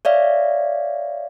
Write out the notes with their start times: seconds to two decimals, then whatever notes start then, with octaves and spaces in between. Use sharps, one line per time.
0.05 C#5 D5 E5 F5